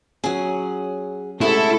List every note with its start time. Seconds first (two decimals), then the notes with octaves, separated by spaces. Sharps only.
0.24 F#3 C#4 G#4 F#5
1.41 C3 G#3 A3 C#4 E4 F#4 A4